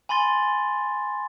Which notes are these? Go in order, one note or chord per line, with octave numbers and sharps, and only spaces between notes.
G#5 B5 C6 A6 G7